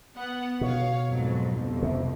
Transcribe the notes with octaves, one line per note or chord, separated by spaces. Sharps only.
B3 F#5
B2 C#5 F5
F2 G#2 F#3
G1 C2 F2
C3